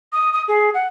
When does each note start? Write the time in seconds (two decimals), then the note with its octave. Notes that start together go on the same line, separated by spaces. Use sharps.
0.13 D#6
0.33 D#6
0.48 G#4
0.74 F#5